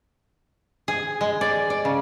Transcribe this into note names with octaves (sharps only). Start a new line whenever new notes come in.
G#4
G#3
D5
D5
C#3